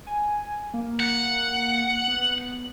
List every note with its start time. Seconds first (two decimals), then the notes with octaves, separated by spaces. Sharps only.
0.07 G#5
0.74 A#3
1.00 F#5
2.08 B3